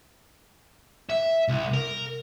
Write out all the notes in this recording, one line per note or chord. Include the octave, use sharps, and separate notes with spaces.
E5
C2
A#4